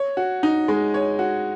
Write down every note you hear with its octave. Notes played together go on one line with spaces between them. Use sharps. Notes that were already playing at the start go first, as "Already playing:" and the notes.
Already playing: C#5
F#4
D#4
G#3
C#5
F#4